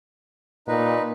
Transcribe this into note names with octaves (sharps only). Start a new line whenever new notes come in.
A#2 D#4 B4